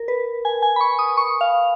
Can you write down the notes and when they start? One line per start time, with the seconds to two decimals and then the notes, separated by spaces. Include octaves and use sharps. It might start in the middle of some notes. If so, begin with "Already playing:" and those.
Already playing: A#4
0.08 B4
0.45 G#5
0.62 G#5
0.76 B5
0.81 C#6
0.99 D#6
1.17 C#6
1.41 F5